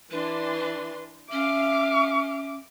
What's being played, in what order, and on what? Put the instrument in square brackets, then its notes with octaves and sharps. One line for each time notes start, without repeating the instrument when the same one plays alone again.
[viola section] E3 D4 C6 [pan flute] B4
[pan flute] C#4 [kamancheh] E5 D6 [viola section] F5